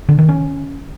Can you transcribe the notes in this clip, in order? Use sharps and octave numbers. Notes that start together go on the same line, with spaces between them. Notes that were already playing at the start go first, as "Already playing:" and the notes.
D3
D#3
C#4